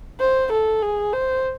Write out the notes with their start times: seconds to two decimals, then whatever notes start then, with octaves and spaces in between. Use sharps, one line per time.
0.20 C5
0.52 A4
0.82 G#4
1.13 C5